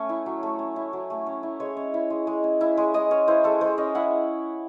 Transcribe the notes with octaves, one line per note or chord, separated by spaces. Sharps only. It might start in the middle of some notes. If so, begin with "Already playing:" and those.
Already playing: A3 C#4 C#5
E4
F#3
A3
C#4
E4
F#3
A3
C#4
E4
G#3 C#5
C#4
E4
G#3
G#3
C#4
E4
G#3
G#3 D#5
C#4 C#5
E4 C5
G#3 A4
G#3 C5
C#4 D#5
E4 F#5